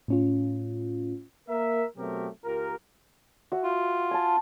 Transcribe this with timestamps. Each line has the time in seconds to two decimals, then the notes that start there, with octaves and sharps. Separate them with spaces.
0.08 A2 C#4 F4
1.49 A#3 A#4 E5
1.97 B2 F#3 A3 C4 G4 A#4
2.45 C#2 F4 G4 A#4
3.52 F#4 E5
3.63 F4
4.11 G#5 A5